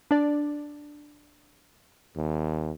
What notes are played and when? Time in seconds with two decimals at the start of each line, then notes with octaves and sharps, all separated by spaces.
0.11 D4 D5
2.16 D#2